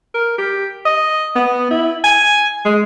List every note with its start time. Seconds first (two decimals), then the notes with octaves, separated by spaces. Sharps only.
0.14 A#4
0.38 G4
0.85 D#5
1.36 B3
1.71 E4
2.04 G#5
2.65 G#3